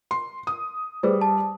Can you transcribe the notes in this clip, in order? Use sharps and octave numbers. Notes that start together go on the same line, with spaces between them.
C6
D#6
G3 G#4 B4 C5
A5